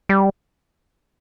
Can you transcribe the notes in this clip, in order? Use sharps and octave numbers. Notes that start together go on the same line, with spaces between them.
G3